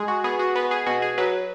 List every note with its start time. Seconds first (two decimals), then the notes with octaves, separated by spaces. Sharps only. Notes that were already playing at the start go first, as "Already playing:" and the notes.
Already playing: G#3 G#4
0.08 F#4
0.24 B3 G#4
0.39 F#4
0.56 B3 B4
0.71 G#4
0.86 B2 F#4
1.02 G#4
1.18 F#3 B4